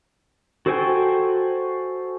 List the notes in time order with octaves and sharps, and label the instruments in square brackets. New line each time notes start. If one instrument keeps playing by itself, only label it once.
[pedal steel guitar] F#4 A4 C5 G5 G#5